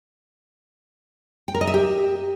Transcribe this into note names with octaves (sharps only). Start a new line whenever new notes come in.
G5
A#4
D#5
E5
G4